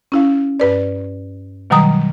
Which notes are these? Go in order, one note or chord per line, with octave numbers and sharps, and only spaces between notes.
C#4 E4 F5
G2 B4 D5
B2 D#3 F#3 G3 A#5 D#6